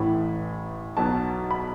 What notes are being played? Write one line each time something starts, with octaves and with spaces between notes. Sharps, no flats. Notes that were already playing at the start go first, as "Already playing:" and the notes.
Already playing: A1 A2 E3 B5
B1 B2 F#3 A5
B5